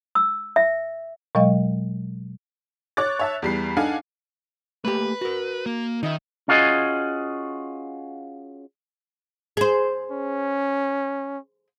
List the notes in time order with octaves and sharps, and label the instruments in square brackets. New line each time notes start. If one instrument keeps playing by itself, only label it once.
[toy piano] E6
E5
[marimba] B2 F#3 G#3 D#5 F5
[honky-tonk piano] C#5 C#6 D6 F#6 A6
C#5 E5 A5
E2 G3 C7
D4 D#4 A4 F5 F#5 G#5
[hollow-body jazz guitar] A3 A#3 G4 [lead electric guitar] B4
[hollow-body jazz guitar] F#4 A#4
[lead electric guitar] A#3
[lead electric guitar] D#3 [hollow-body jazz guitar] D#4 D#5 E5
[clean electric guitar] C#4 F4 F#4 G#4 D#5
[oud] G#4 C5
[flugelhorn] C#4